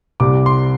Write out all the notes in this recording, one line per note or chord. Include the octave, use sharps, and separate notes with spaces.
C2 C3 G3 D6
C6